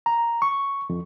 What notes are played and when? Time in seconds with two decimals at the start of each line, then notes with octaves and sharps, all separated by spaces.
0.06 A#5
0.42 C#6
0.90 F2